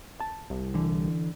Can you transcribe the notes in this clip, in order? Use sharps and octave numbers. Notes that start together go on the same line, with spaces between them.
A5
C2
D3 E3